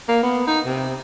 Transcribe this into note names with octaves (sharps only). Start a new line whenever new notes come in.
A#3
B3
D#4
C3